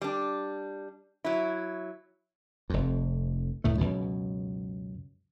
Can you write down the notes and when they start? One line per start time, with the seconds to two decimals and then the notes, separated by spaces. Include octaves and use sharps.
0.01 G3 D4
1.24 F#3 E4
2.70 F1 F2
3.64 C#2 A2 A3
3.78 C#2 F#2 B2